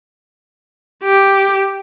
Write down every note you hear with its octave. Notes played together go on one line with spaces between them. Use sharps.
G4